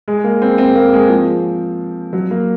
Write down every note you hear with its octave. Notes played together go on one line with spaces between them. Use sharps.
G#3
A#3
C4
C4
A#3
G#3
F3
F#3
A#3